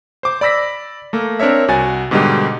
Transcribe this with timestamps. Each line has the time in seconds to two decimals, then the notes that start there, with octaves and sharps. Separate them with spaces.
0.23 C5 D6
0.41 D5 B5 E6 A#6 B6
1.13 A3 A#3
1.39 C4 D4 A#4 C#5 E5
1.68 C2 F#4 G#5 A6
2.11 G#2 B2 D3 G3 D#4 G4